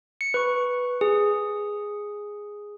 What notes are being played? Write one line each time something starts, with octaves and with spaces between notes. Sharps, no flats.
C#7
B4 C#6
G#4